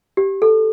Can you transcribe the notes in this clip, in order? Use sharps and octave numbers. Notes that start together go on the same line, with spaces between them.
G4
A4